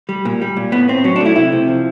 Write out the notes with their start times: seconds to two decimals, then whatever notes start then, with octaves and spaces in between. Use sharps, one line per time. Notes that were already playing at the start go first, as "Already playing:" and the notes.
0.09 G3
0.25 A#2
0.42 G3
0.57 A#2
0.72 A2 B3
0.88 A2 C4
1.04 F#3 C#4
1.16 D4
1.21 A3 E4
1.36 C3 E4
1.52 C3
1.68 F3